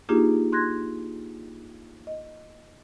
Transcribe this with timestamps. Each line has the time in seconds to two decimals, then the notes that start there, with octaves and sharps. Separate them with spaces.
0.09 A#3 D4 D#4 F4 G4 G#4
0.52 C6 F#6 G#6 A#6
2.07 D#5